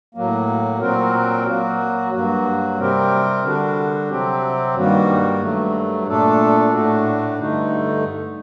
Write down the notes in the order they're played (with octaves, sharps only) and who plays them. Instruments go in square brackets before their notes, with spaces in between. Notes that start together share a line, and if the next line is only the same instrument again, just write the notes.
[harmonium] A2 F#3 A#3
A#2 F#3 C4 F#4 A#4
F#3 A#3 F#4
G2 F#3 A#3 F#4
C3 G3 C4 G4 A#4
D3 G3 D4 F#4
C3 F#3 C4 G4
G2 D#3 G3 A#3 F#4
G2 F#3 A3
A#2 A3 D4 A4
A2 A3 D4 F#4
G2 D3 A3 D#4